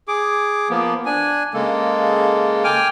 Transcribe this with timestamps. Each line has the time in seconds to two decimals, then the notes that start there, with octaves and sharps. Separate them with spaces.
0.08 G#4 D6
0.70 F3 A#3 B3
1.06 D4 G#5
1.54 C#3 G#3 A#3 A4
2.64 G5 G#5 D6 F6